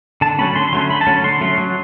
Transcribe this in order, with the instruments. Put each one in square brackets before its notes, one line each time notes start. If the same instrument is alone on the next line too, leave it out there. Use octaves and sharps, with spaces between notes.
[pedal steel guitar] D3 A5
F#3 A3 C#4 B5
D3 C6
F#3 A3 C#4 C6
D3 B5
A5
F#3 A3 C#4
D3 C6
F#3 A3 C#4
F#3